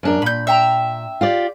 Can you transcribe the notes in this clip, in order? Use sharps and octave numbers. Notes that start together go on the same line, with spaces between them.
F#2 D4 A#4
A#2 B5 G6
E5 G5 A#5
F4 G4 D5